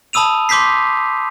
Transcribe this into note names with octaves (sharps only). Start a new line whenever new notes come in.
A5 B5 D#6 E6 D#7 F7
C6 D6 G6 B6 C7